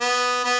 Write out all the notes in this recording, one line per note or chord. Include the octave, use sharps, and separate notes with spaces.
B3
B3